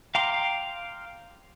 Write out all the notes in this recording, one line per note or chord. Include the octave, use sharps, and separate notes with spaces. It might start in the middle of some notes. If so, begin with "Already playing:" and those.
F5 G5 A#5 C6 D6